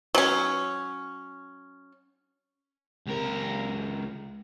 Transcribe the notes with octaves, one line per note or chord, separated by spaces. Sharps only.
F#3 C#4
C#2 A#4